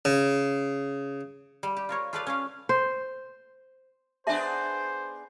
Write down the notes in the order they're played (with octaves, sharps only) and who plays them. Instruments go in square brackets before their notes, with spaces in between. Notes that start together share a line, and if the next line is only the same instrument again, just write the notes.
[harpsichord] C#3
[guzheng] G3
G4
F4 A#4 C#5
F4 G4 A4 B4 D5 F5
C#4 A4 F5
[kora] C5
[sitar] B3 D4 G#4 [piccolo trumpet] C5 [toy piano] E5 A5